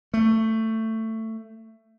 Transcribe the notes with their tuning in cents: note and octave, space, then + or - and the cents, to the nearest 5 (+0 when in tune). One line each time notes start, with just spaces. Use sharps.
A3 +15